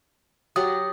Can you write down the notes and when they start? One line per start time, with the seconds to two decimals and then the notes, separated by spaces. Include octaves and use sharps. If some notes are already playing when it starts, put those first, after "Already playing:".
0.56 F#3 G4 F#5 D#6